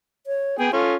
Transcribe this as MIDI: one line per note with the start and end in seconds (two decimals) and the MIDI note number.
0.27 0.59 73
0.59 0.70 59
0.59 0.72 68
0.59 0.72 79
0.73 0.96 61
0.73 0.96 65
0.73 0.95 69